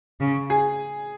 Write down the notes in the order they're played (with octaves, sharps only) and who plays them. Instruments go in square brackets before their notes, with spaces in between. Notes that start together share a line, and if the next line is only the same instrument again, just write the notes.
[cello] C#3
[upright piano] G#4